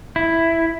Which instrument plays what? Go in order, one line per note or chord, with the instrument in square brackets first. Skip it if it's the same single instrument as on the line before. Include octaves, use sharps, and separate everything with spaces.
[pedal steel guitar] E4